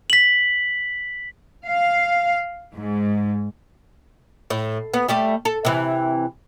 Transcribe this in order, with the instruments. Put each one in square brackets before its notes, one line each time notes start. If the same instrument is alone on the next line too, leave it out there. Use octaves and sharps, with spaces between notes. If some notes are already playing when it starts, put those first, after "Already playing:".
[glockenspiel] B6 F#7
[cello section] F5
G#2
[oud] A2
B3
G3 A3 G4
A4
C3 E3